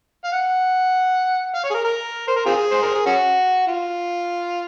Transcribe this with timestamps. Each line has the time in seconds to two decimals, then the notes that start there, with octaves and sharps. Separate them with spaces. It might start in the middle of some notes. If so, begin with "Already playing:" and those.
0.24 F5
0.32 F#5
1.54 F5
1.64 C#5
1.70 G#4
1.74 A#4
1.84 A#4
2.27 C5
2.36 A#4
2.46 C4 F4 G#4
2.71 C5
2.82 A#4
2.94 G#4
3.06 C#4 F#4
3.68 F4